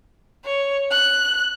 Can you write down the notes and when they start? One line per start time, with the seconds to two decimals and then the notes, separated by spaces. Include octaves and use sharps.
0.45 C#5
0.91 F#6